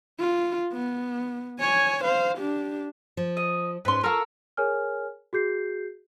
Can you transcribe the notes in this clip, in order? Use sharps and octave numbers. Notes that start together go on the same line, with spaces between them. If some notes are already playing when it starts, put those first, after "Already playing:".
F4
B3
C#5 G#5
C5 F5
D4 G4
F3
D#5
G#2 C#4 B4 C6
F4 A4 A#4 F5 C#6
G#4 A#4 C#5 G#5 F6
F#4 G#4 G6 C7